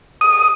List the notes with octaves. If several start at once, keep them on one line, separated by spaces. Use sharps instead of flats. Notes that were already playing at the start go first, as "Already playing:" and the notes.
D#6